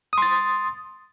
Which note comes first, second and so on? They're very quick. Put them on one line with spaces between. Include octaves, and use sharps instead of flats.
D#6 C6 A6